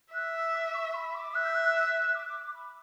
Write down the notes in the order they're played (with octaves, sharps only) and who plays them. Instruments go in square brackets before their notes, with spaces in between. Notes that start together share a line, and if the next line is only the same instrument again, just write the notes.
[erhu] E5 [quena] F#6
[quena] E6
D6
C#6
B5
D6
[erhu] E5 [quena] F#6
[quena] G6
E6
F#6
F#6
F#6
D6
B5